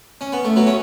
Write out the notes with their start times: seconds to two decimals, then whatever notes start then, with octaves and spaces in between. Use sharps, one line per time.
0.21 C#4
0.33 B3
0.45 A3
0.56 F#3 B3
0.67 C#4